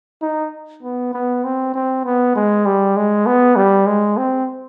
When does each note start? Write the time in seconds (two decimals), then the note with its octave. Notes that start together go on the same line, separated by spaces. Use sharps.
0.22 D#4
0.83 B3
1.13 B3
1.44 C4
1.74 C4
2.05 B3
2.36 G#3
2.66 G3
2.96 G#3
3.26 B3
3.56 G3
3.87 G#3
4.17 C4